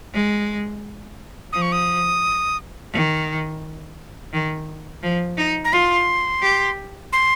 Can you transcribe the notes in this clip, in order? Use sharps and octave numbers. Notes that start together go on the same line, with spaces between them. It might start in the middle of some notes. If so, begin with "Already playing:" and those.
G#3
F3 D#6
C#6
D#6
D#3
D#3
F3
D#4
A#5
F4 C6
G4
C6